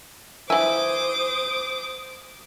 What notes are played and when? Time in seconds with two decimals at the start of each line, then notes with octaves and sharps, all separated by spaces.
0.50 E3 C5 E5 G#5 D6 D#6